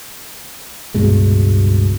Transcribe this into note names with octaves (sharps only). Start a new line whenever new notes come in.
C#2 G2 B2 G#3